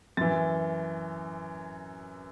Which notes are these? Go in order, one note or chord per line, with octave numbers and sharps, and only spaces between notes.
F#2 E3 A6